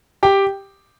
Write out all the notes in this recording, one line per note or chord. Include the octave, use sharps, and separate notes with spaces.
G4 G5